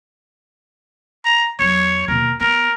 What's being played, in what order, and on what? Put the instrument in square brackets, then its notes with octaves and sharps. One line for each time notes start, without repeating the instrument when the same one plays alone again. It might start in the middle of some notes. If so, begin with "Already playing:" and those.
[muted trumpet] A#5
[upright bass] E2 F#3 [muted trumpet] C#5
[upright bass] D#2 B2 [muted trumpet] A#4
[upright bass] B3 [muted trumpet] A#4